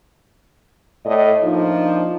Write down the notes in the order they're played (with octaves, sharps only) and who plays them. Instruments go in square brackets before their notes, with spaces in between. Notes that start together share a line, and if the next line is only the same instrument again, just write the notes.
[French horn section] A2 D5 D#5
F3 A#3 D4 D#4